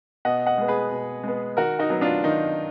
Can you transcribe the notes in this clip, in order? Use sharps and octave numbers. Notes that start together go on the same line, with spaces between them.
B2 D#5 F#5
D#5 F#5
G#3 B3
G#4 B4
B2
G#3 B3
D#3 F#4 A#4
D#4 F#4
F#3 B3
D4 F4
D#3 D#4